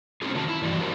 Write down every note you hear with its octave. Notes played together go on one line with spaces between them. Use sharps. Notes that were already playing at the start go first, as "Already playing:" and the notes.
C4 C#4 D#4 F4 G#4
C3 D#3 D#4 F#4 A5
E4
G2 E3 D#4 F#4 D5
F3 D4 F#4 G4 A#4